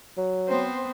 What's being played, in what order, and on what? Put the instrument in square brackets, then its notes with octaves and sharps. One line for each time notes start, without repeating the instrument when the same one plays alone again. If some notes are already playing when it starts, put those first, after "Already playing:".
[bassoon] F#3
[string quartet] B3 C4 C5